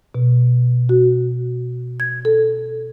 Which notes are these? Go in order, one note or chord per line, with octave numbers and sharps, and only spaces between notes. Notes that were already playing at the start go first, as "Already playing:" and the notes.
B2
F#4
G#6
A4